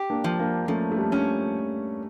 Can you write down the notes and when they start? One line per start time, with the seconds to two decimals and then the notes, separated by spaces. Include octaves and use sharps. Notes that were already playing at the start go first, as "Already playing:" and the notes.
Already playing: G4
0.10 A#3 D4
0.24 F3
0.39 A#3 D4
0.68 F3 A3 C#4
0.92 A3
0.98 G3 A#3
1.12 C#4